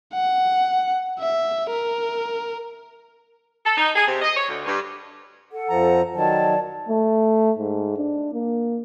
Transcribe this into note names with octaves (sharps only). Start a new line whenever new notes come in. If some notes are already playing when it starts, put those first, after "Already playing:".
F#5
E5
A#4
A4
D#4
G#4
C3
D#5
C#5
D2
G2
A4 F#5
F2 F3 A#5
D#3 F#3 D5 A5
A3
G#2
D4
A#3